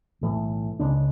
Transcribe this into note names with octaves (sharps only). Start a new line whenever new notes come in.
B1 A2 E3 A3
C#2 C#3 G#3 D4